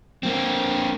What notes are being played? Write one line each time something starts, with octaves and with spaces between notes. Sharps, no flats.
A#3 C4